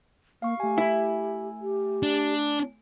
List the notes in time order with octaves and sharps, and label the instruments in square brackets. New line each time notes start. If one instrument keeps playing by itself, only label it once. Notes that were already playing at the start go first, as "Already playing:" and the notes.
[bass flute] A#3 [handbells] F5 C#6
[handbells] A3 G#5 [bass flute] G4
[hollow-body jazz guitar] E4
[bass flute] G4
[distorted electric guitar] D4